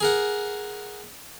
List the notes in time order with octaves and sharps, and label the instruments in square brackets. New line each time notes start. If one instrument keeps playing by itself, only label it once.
[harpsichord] G#4 A#4 F#5